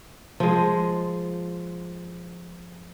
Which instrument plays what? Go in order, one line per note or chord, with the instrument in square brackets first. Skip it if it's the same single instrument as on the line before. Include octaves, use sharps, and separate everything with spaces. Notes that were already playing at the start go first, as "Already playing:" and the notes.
[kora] F3 G#3